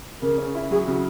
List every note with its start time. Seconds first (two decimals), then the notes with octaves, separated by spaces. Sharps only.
0.22 C#3 A#4
0.38 C#4
0.55 E4
0.71 F#3 G#4
0.87 C#3 F#4